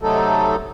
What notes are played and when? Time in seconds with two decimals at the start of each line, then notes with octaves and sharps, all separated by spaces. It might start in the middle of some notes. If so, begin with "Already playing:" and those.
0.02 C3 F#3 A3 D#4 A4